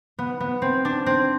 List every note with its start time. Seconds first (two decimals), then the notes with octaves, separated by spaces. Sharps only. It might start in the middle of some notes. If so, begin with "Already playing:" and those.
0.19 B3
0.40 B3
0.62 C4
0.85 D4
1.06 C4